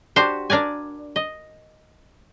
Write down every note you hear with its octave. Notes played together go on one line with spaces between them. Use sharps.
D4 F#4 G4 C5
D4 A#4 D5 G#5
D#5